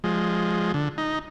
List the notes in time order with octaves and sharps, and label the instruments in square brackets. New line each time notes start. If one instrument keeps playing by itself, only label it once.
[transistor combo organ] F3 G#3
D3
D#4